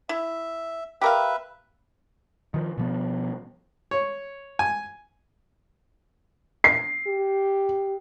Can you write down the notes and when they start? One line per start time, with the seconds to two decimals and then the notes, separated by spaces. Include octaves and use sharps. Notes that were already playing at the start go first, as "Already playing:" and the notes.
0.09 E4 E5
1.01 G4 A#4 B4 E5 F5
2.54 D#3 F3
2.78 B2 F3 B3
3.91 C#5
4.59 G#5
6.64 C7
7.07 G4